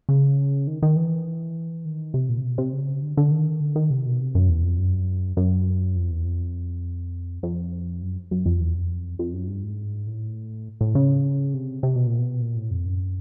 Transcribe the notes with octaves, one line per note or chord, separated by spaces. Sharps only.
C#3
D#3
D#3
E3
D#3
C3
A#2
C3
B2
C3
C#3
D3
D3
D#3
D3
D#3
C3
B2
C3
F#2
E2
F2
F#2
F#2
F2
E2
F2
F2
F#2
F#2
F2
E2
F2
F2
F#2
G2
G#2
A2
A2
C#3
C3
C3
B2
A#2
B2
A#2
A2
F2
F#2